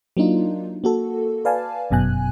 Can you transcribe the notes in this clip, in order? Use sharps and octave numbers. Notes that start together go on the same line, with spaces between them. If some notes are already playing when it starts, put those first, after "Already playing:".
F#3 A#3 D4 D#4 F4
A#3 F#4 A4
B4 D5 F5 G#5 A5
G1 F#2 B2 G#5 F#6